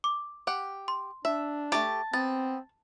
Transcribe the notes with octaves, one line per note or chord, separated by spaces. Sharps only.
D6
G4 F#5
C6
D4 E5
A3 G4 A5
B3 C4 A6